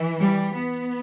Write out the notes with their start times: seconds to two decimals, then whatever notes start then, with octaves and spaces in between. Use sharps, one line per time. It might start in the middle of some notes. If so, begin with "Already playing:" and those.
Already playing: E3
0.20 G3
0.54 B3